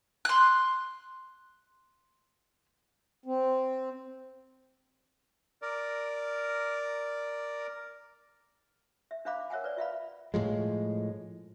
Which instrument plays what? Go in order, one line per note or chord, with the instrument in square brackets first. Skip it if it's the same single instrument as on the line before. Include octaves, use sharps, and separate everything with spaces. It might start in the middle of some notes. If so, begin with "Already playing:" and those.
[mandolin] C6 F#6
[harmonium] C4
[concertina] A#4 D5
[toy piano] E5
D4 C5 E5 F5 B5 D6
A#4 C#5 E5 F#5 G#5
B4 D5
F4 E5 F5 B5
[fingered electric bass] A2 F3 G#3